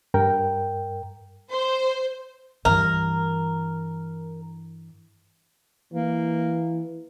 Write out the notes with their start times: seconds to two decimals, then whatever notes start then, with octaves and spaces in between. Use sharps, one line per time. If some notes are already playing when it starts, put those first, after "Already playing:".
0.14 G2 A#4 G5
1.50 C5
2.65 G2 E3 A#4
5.93 E3 A#3